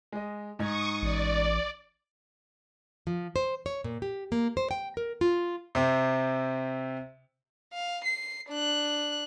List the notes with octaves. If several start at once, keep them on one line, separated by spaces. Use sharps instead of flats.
G#3 D#5
G#2 D#4 C#6 D#6 G#6
A1 D5
F3
C5
C#5
A#2
G4
A#3
C5
G5
A#4
F4
C3 C4
F5
C7
D4 F#6